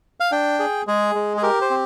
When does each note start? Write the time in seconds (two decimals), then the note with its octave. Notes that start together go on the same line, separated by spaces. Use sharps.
0.20 F5
0.31 D4 G5
0.59 G#4
0.87 G#3 G#4
1.15 G#3
1.37 G#4
1.43 G4 A#4
1.61 C5
1.70 C4